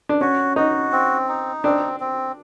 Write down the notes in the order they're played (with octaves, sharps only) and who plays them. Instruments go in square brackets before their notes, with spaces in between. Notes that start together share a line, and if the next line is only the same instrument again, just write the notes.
[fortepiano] D4
[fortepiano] C#4 [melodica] F#4
[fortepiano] D#4 [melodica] F#4
[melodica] C4
D#4
[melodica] C4 [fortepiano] D4
[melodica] C4